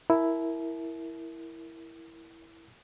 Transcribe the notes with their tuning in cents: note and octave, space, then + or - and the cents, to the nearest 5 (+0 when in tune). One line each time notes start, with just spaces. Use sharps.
E4 +0 A#4 +0 A5 -45